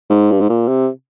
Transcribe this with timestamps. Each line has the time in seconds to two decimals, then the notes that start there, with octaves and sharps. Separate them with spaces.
0.10 G#2
0.32 G2
0.41 G#2
0.49 A#2
0.68 C3